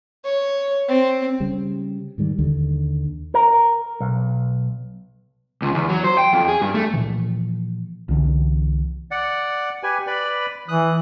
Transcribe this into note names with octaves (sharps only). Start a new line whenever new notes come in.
C#5
C4
C#3 G3
G#2 D#3 G3
D#2 D3
A#4
B1
C#2
E2
F#3
C5
G5
F2
G#4
G2
A3
A#2 E3 F3
C2 D3 E3
D5 F#5
G4 B4 G#5
B4 D5 B5
E3 D#6 F#6